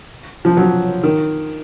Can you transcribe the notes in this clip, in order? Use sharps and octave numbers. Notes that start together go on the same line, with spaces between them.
F3
F#3
D#3